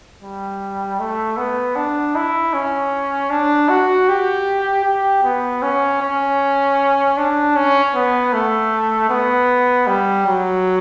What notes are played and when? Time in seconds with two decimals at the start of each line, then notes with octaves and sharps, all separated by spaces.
0.22 G3
1.00 A3
1.37 B3
1.76 D4
2.16 E4
2.54 C#4
3.30 D4
3.69 F#4
4.09 G4
4.85 G4
5.24 B3
5.63 C#4
6.02 C#4
7.18 D4
7.56 C#4
7.94 B3
8.33 A3
9.10 B3
9.87 G3
10.27 F#3